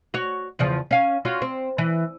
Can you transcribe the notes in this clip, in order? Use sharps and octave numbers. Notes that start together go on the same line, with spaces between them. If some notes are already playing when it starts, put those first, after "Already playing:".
F#4 C#5
E2 C#3 F3
C#4 F5
C#4 F4 F#4
C4
E3